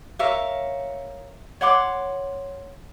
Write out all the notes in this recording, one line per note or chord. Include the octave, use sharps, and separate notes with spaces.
A#4 C#5 E5 F5
C#5 F#5 C6 D6